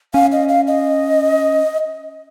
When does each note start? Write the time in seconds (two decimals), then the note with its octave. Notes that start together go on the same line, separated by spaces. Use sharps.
0.14 C#4 F5
0.32 D#5
0.49 F5
0.67 D#5